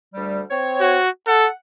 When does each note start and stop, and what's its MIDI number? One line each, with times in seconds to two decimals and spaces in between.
0.14 0.40 38
0.14 0.40 55
0.51 0.98 60
0.51 0.98 73
0.80 1.10 66
1.27 1.48 69
1.27 1.49 78